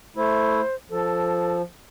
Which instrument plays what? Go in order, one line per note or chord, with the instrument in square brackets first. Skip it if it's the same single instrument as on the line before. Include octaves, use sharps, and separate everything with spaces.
[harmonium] A3 E4 [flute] C5
[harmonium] F3 [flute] A4